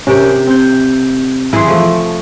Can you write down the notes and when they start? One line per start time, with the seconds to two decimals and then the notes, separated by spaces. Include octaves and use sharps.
0.07 C3 C#4 G4 A#4
0.47 C4 G6
1.53 E3 E4 G#4 E5 C6
1.68 F3 A3